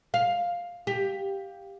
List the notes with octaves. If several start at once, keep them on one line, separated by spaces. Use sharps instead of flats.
F5
G4